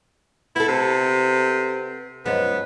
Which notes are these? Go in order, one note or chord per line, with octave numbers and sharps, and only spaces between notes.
B3 E4 A4
C3
F#2 F3 G#3 B3